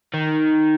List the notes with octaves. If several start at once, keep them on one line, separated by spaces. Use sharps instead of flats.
D#3